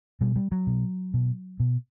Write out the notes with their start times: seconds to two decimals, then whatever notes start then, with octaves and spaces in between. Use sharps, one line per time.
0.21 B2 G3
0.36 G3
0.52 F#3
0.67 B2
1.14 B2
1.60 B2